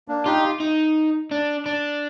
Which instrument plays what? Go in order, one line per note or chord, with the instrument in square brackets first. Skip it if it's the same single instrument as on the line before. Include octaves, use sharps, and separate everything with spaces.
[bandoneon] A#3 D4
[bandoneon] D#4 G4 [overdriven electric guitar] F4
[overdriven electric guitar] D#4
D4
D4